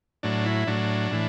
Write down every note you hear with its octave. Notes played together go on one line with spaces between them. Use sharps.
A2 F#3 D4
E4
A2 F#3 D4
A2 E3